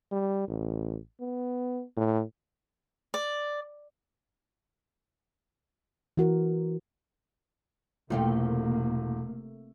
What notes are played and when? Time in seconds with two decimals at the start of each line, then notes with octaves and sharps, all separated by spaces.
0.12 G3
0.48 A1
1.21 B3
1.97 A2
3.14 D5
6.17 E3 F#4 A#4
8.10 E1 C3 A3 A#3 C4 F4